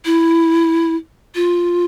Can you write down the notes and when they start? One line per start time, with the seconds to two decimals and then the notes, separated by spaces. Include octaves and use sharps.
0.05 E4
1.35 F4